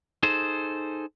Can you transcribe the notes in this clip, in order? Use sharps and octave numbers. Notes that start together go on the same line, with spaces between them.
D#4 G#4 A4 C5